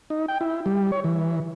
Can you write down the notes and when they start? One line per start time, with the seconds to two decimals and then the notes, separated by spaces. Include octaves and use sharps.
0.10 D#4
0.28 G5
0.41 E4
0.66 G3
0.92 C#5
1.04 E3